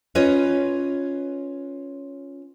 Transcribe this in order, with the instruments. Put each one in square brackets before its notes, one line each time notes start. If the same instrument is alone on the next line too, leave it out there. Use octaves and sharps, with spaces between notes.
[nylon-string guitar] C#4 F4 B4 C#5 D#5